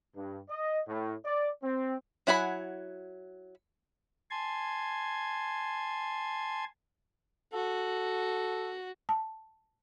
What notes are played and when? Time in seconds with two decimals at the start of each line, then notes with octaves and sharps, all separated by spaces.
0.16 G2
0.49 D#5
0.88 A2
1.25 D5
1.63 C4
2.27 F#3 E4 F#5 G#5 B5
4.31 G#5 A5 C6 G#6
7.53 F#4 A4
9.09 A5